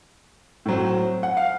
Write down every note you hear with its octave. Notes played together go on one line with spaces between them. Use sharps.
A2 F#3 C4
F#5
F5